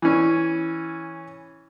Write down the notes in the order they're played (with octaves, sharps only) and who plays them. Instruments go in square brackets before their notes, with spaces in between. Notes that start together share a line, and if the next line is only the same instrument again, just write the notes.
[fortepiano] E3 C#4